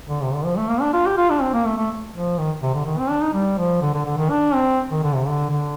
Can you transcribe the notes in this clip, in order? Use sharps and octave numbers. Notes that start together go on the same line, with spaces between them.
D3
C3
D3
F3
A3
A#3
D4
F4
G4
F4
D4
C4
A#3
A3
A3
F3
D#3
C3
D3
D#3
C4
D4
D#4
G3
F3
D3
D3
D3
D#3
D4
C4
D#3
D3
C3
D3
D3